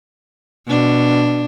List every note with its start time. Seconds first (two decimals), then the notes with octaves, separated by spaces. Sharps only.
0.67 B2 D4